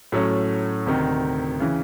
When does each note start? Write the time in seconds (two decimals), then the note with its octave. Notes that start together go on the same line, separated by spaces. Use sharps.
0.12 A2 F#3 A3 C#4
0.86 D2 C3 D#3
1.60 C#3 E3